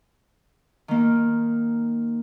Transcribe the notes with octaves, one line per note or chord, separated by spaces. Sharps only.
D#3 A#3